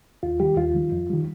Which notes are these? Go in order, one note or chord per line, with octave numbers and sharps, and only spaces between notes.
D#2 F4
D#3 G3 G4
D#2 F4
D#3 G3
F2
D#3 G3